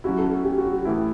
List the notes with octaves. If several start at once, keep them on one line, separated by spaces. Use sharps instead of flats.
F#3 C#4 E4 F#4
A4
A4
G4
F#4
G4
A2 E3 A3 E4